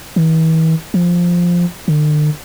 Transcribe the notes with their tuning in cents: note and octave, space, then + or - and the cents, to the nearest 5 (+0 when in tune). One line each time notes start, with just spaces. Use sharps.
E3 -40
F3 +0
D3 +45